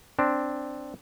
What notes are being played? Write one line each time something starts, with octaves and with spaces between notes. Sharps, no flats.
C4 D4